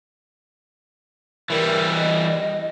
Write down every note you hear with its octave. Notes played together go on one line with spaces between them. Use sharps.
E3 G3 A#4
D#5